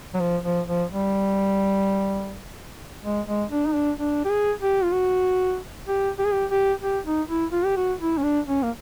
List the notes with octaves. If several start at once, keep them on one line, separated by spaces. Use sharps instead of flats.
F#3
F3
F3
F3
G3
G#3
G#3
D4
D#4
D4
D4
G4
G#4
G4
F4
F#4
G4
G4
G#4
G4
G4
G4
D#4
E4
F4
G4
F#4
E4
C#4
D4
C#4
A#3